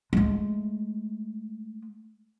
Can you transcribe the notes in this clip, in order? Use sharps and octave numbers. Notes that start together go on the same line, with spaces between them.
G#3 A3